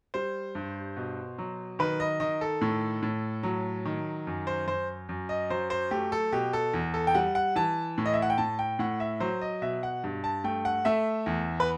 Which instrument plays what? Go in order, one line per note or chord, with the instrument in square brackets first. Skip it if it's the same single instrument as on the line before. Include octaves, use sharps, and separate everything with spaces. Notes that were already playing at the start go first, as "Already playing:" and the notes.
[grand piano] G3 C5
G2
B2
F#3
D#3 B4
D#5
D#3 D#5
A4
A2
A2
F#3
D#3
F#2
C5
F#2 C5
F#2
D#5
F#3 C5
C5
A3 G4
A4
B2 G4
A4
E2
A4
G5
G3 F#5
F#5
E3 A5
A2
D#5
E5
F#5
G5
A2 A5
G5
A2 F#5
E5
F#3 C5
D#5
B2 E5
F#5
G2
A5
A3 G5
F#5
A3 E5
E2
B4